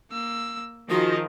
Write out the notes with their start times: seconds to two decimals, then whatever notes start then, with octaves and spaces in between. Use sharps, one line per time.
0.12 A#3 E6
0.90 D#3 F3 F#4 G#4 D#5